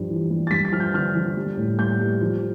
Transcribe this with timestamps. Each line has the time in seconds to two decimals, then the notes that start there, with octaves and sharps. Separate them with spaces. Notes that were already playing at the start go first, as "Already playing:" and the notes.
Already playing: G2 F3 G3
0.09 E3
0.30 G3
0.47 A6
0.51 G2 B6
0.65 A6
0.72 F3 F6
0.80 G6
0.94 D3 F6
1.15 F3
1.37 G3
1.57 A2
1.79 G3 G6
2.00 G3
2.21 F3